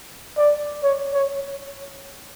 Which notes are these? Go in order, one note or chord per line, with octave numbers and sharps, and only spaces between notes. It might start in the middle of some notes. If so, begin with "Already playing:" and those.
D5
C#5
C#5